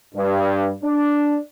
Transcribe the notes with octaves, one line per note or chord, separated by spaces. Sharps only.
G2
D4